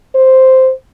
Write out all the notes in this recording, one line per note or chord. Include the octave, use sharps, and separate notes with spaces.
C5